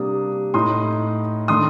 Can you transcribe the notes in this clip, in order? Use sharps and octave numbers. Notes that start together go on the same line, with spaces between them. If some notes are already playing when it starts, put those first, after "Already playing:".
Already playing: C3 G3 A#3 D4 D#6
A2 A3 D#4 C6 D#6
D#3 A3 D4 C6 D#6